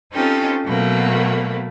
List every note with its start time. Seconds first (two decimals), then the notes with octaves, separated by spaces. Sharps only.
0.12 C4 C#4 D#4 F4 G4 A4
0.64 B2 F#3 A3 A#3 C4